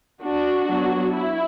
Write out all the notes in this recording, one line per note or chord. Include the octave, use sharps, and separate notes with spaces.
D4 F#4
F#3 B3 D4
E4